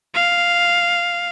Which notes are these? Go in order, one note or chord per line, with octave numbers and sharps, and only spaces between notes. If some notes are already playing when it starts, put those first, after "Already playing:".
F5